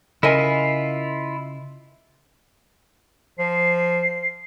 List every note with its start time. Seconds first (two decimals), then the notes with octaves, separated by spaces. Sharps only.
0.23 C#3 E4 F4 A#4 D#5 G#5
3.39 F3 C7